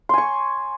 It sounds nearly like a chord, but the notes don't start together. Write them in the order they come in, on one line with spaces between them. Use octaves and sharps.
C6 G#5 C#6